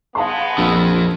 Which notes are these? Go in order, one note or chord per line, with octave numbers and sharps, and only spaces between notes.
G#3 B3 F5 A5 C6
A#1 F2